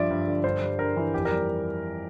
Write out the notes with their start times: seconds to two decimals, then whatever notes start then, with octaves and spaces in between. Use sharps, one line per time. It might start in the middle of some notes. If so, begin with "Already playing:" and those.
Already playing: G2 F3 D5 E5
0.10 G2
0.27 D3
0.44 G2 C5
0.62 G3
0.79 G2 A#4
0.96 E3
1.14 F2 G4
1.25 A#4
1.31 G3